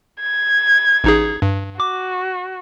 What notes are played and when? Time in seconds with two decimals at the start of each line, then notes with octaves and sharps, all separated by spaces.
0.21 G#6
1.04 A1 D#4 G#4
1.42 G2
1.80 F#4 D6